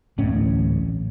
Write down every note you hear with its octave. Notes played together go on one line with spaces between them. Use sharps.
D1 A1 A2 C#4